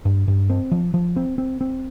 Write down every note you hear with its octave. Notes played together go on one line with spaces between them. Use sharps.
G2
G2
C4
F3
F3
C4
C4
C4